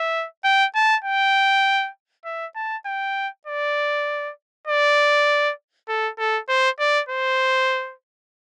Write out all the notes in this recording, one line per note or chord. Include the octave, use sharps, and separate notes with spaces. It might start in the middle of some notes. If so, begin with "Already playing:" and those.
Already playing: E5
G5
A5
G5
E5
A5
G5
D5
D5
A4
A4
C5
D5
C5